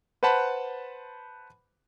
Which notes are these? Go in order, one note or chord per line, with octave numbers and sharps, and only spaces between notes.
B4 C5 F#5 A5 B5